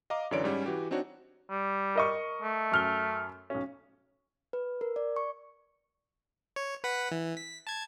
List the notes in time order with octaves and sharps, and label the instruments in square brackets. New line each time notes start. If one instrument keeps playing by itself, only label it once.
[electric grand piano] D#5 F5 A#5 D6
F#2 D3 E3 C#5 D5 D7
G#2 G3 C#4
E3 F#4 G4
C4 D4 D#4 F#4 C#5
[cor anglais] G3
[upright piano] A#4 D#5 C#6
[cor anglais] A3
[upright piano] F#2 F6 G7
B1 C#4
[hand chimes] B4
A#4
D5
C#6
[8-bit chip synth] C#5
B4 F#5 B6
E3
B6
A5 G#6